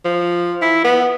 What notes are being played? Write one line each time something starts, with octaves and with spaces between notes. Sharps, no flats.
F3
E4
B3